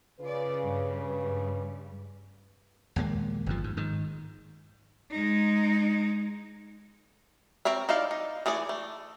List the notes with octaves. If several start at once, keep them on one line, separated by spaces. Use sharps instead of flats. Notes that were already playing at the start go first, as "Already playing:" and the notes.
C#3 F4 B4 D5
G2 G3
A#1 D#2 G#3 A#3
G1 F2 F3
G#2
G#2 D#3
G#3 D#4
C4 A#4 C#5 E5
D#4 E4 D5 F5
D#4
E3 A3 G#4 D5
A3